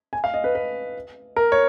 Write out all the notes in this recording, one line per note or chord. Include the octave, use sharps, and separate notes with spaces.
G#5
F5
D#5
B4
B4
A#4
C#5